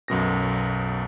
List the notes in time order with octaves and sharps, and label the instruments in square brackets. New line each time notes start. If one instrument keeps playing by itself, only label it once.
[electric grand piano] B1 F#2 B2 A#6